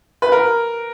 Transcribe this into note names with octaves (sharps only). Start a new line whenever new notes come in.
B4
A#4